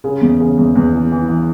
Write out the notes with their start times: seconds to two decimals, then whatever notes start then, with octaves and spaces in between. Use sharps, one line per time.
0.04 C#3
0.21 E2
0.40 C#3
0.57 E2
0.75 E2
0.93 E3
1.12 E3
1.29 E3